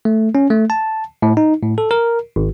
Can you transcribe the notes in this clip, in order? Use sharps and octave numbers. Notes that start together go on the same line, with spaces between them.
A3
C#4
A3
A5
A2
D#4
A2
A4
A#4
G#1